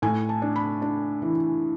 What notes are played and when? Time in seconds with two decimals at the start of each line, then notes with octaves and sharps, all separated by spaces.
0.02 A2 G#5
0.29 A5
0.42 D4
0.56 B5
0.82 D4
1.22 E3